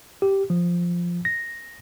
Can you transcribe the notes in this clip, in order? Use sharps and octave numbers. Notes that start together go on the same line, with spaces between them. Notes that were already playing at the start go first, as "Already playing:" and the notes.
G4
F3
A#6